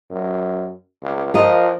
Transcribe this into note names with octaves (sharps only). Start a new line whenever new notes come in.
F#2
C#2
F3 F4 A#4 D#5